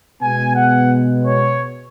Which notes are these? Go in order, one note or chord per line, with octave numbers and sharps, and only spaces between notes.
B2 G#3 B3 G#5
F#5
C#5